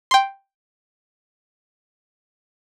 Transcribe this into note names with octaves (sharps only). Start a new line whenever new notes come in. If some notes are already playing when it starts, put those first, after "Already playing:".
G5 C6